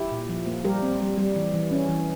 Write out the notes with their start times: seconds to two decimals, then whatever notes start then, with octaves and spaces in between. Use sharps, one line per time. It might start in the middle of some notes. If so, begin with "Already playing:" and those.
Already playing: E4 G4
0.11 A#2
0.29 F3
0.47 A#3
0.64 G3 G4 A#4
0.82 C4
1.00 G3
1.18 G3
1.36 E3
1.54 E3
1.71 C#4
1.89 E3